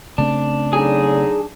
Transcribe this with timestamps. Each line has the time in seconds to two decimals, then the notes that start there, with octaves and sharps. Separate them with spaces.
0.18 C#3 A3 C4 D4
0.73 D3 F#3 D#4 G#4